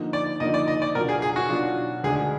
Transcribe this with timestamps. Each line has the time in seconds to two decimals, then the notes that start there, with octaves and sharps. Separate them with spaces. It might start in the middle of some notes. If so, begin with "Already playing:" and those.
Already playing: D3 F3 A#3 D#4
0.13 D5
0.40 D3 F3 A#3 D#4 D#5
0.54 D5
0.68 D#5
0.82 D5
0.95 B2 F#3 D4 F4 A#4
1.09 G#4
1.22 G#4
1.36 F#4
1.49 B2 F#3 D4 F4
2.04 D2 D3 G#3 D4 G#4